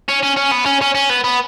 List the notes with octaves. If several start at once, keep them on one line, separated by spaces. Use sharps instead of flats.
C#4
C#4
C#4
B3
C#4
C#4
C#4
B3
B3